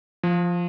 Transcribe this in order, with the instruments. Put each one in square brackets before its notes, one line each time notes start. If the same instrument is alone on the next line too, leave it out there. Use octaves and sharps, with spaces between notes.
[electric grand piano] F3